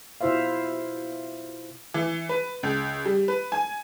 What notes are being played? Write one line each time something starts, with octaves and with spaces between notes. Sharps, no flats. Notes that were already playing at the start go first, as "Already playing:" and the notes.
B2 E4 F4 C5 E5 F5
E3
B4
C#2
G3
B4
G#5